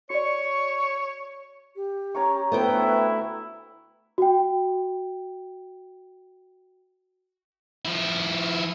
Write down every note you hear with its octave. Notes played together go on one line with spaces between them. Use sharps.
F#4 C#5 D5 C#6
G4
C#4 A#4 C#6
D2 A3 B3 E4 B4 C5 G5
F#4 G5
F3 E4